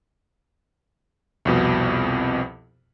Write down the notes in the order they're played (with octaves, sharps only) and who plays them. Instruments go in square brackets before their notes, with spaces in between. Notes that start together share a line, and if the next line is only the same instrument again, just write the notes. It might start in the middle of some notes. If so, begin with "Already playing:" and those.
[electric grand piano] C2 F2 B2